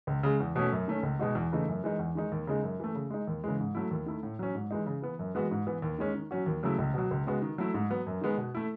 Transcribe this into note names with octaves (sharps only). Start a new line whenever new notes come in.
C#2
C#3 G#3
E2
B2 A3 C#4
F#2
D#3 A3 C#4
C#2
B2 G#3 D#4 F#4
E2
C#3 E3 A3 D#4
F#2
E3 G#3 D#4
E2
D#3 G#3 D#4
D#2
C#3 G#3 D#4
F#2
E3 A3
C#3
G#3 D#4
D#2
C#3 E3 G#3
G#2
F#3 A3 E4
D#2
D#3 A3 E4
A2
F#3 C#4
G#2
E3 G#3 D#4
C#3
E3 B3
F#2
E3 G#3 B3 F#4
G#2
E3 B3
D#2
D#3 G#3 C#4
D#3
F#3 C#4 F#4
D#2
C#3 F#3 A3 E4
C#2
B2 F#3
C#2
C#3 G#3 B3 F#4
D#3
F#3 A3 E4
G#2
F#3 B3
F#2
D#3 G#3 B3
B2
A3 E4